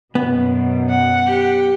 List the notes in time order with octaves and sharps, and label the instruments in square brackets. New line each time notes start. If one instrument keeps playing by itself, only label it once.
[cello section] F#2 B2 [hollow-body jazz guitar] B3
[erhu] F#5
[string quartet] G4